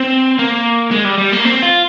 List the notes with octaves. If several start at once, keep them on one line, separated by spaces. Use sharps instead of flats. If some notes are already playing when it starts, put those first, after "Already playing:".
Already playing: C4
A#3
G#3
G3
G3
A#3
C4
F4